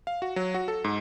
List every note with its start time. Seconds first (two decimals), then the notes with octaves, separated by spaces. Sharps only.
0.07 F5
0.22 F#4
0.36 F#3
0.54 F#4
0.68 A4
0.84 G#2